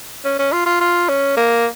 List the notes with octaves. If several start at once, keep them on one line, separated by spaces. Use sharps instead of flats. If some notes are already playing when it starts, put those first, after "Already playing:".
C#4
C#4
F4
F4
F4
C#4
A#3